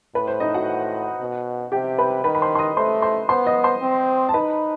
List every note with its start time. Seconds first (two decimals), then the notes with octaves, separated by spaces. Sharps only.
0.15 A2 B4
0.27 C5
0.40 D#4 D#5
0.54 F#4 F#5
1.20 B2
1.72 C3 G4 G5
1.98 B4 B5
2.24 D#3 B4 B5
2.35 B5
2.41 C5 C6
2.55 C6
2.59 D#5 D#6
2.77 A3 C5 C6
3.02 C5 C6
3.29 B3 C5 C6
3.46 D#5 D#6
3.64 C5 C6
3.82 C4
4.29 A5
4.34 D#4 B4 B5